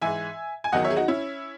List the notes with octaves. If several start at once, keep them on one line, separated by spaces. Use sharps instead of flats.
G#2 E3 E5 G#5
G#5
E2 D#3 F#3 D#5 F#5
C#5 E5
G#4
D#4 F#4
C#4 E4